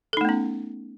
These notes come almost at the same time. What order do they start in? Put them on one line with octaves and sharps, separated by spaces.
A4 D#4 A3 B3 C#4